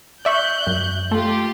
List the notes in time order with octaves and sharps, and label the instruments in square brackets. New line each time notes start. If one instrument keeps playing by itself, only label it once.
[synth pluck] D5 E5 C#6 [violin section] F#6 G6
[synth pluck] F#2
[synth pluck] A3 [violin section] F4 G4